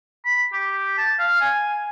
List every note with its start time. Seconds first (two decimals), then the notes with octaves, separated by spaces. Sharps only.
0.25 B5
0.52 G4
0.98 A5
1.19 F5
1.41 G#5